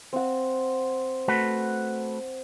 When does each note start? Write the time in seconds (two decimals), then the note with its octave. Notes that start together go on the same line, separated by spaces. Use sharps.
0.13 C4 F#5
1.28 A3 F#4 B4